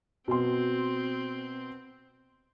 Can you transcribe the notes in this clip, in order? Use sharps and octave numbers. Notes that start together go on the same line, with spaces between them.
B2 C4 C6